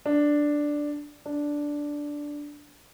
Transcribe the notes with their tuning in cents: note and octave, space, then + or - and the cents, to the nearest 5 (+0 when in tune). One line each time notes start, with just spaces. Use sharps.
D4 +0
D4 -5